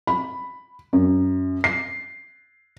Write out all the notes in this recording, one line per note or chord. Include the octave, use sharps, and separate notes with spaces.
B5
F#2
C7